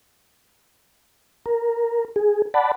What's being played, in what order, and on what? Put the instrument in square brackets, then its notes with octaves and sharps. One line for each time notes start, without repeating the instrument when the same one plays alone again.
[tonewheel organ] A#4
G#4
D5 F#5 A5 B5